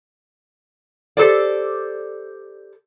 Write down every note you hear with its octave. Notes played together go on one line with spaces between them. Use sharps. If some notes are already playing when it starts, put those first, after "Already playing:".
G4 A4 C5 D5